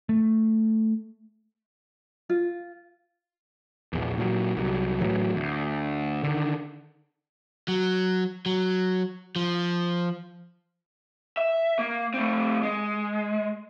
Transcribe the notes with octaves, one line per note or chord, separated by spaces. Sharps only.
A3
F4
A#1 E2
A#2 F3 F#3
C2 F#3
A2 E3 F#3
D2
D3 D#3
F#3
F#3
F3
E5
A#3
A3 C4
G#3